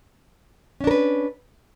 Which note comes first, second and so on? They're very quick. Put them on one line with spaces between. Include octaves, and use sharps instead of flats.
C#4 D4 A#4 B4